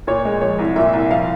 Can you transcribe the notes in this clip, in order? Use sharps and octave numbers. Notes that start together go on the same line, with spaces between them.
A#2 C#5
G#3
F3 C#5
C2
A#2 E5
C2
F3 F5